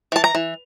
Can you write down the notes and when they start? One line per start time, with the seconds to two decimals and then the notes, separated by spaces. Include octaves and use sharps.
0.12 E3 A5
0.24 A#5
0.35 E3